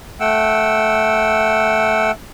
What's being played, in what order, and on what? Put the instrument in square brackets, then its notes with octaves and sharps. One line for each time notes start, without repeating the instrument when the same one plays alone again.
[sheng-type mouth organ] A3 F#5 G5 E6